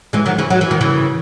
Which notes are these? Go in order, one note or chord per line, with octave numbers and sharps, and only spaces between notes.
E3 G#3
D#3 F#3
C#3 E3
F#3
E3
D#3
C#3 E3